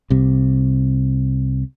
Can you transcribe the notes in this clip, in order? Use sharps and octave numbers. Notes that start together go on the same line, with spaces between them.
C2 C3